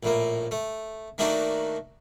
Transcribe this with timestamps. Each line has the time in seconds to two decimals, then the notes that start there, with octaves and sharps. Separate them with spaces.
0.03 A#1 A2 A#3
0.51 A3
1.18 D#3 A3 A#3 D4 D#4 F#4